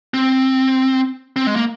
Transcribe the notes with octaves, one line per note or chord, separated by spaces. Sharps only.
C4
C4
G#3
A#3